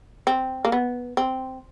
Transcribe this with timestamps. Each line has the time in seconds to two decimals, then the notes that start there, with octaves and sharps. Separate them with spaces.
0.27 C4
0.65 A#3
0.72 B3
1.17 C4